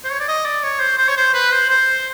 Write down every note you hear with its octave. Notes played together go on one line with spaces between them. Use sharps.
C5
C#5
D5
D#5
D5
C#5
C5
C5
C#5
C5
B4
C5
C5